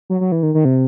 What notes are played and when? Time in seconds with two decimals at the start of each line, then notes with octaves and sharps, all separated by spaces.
0.10 F#3
0.21 F#3
0.32 E3
0.43 D#3
0.54 D#3
0.65 C3